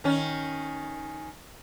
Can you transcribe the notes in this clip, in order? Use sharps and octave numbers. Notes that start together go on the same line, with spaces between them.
D#3 C#4